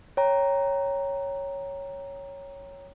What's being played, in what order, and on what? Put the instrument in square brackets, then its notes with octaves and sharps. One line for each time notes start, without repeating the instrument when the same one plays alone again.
[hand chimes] C#5 G5 A#5